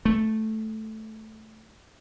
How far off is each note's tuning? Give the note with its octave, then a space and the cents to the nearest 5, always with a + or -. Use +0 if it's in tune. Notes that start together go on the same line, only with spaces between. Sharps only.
A3 -5